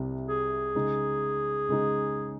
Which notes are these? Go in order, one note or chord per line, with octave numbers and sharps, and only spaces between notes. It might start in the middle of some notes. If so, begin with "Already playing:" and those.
Already playing: C2 C3 G3 C4
G#4
C#3 G#3 D#4
C#3 G#3 D#4